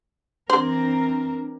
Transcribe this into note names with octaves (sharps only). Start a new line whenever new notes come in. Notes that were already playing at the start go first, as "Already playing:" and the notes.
E3 C4 D4 A#4 C5